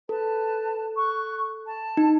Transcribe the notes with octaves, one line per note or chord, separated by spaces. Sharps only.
A4 B4 A5
C#6 F#6
A5
D#4